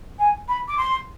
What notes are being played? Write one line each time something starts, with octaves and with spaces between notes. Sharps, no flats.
G#5
B5
D6
C6